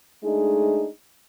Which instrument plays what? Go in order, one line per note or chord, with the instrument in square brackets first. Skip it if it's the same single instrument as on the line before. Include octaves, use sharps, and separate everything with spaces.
[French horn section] G#3 A3 D4 D#4 G#4